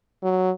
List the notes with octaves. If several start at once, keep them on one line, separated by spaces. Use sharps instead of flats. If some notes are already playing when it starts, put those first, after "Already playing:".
F#3